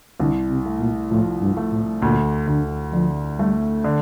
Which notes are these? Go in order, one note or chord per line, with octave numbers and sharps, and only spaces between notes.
C2 D3
C3
A3
A#2
A2 F3
G2
A3
A2
D2 A#2
D2 D3
D3 F3
G3 A3
D3